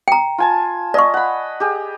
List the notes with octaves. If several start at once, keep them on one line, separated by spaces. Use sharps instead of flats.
G5 A#5
F4 G#5 A5
D5 D#5 F5 C#6
F#5 B5
G4 G#4